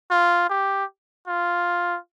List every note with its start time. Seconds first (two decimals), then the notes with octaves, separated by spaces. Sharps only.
0.11 F4
0.49 G4
1.27 F4